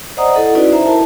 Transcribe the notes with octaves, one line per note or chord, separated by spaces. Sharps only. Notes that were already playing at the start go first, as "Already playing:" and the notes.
C5 D5 D#5 F#5 A#5 D#6
E4 A4 D#5 F#5
C#4 D#4 E4 F#4 B4 D5
C5 E5 A#5
E4 A#4 A5